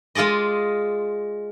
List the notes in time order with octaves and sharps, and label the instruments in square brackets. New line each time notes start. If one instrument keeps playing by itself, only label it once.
[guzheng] G#3 F4 G#4 D5 D#5